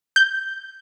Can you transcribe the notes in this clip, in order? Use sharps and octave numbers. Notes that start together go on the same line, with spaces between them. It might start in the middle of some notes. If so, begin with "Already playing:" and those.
G6